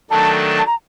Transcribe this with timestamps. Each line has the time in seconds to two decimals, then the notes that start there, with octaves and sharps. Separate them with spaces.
0.10 D#3 F#3 A3 D4 A4 A5
0.58 A5
0.66 A#5